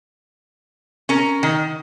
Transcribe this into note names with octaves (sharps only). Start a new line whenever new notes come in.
C#4 A#4
D#3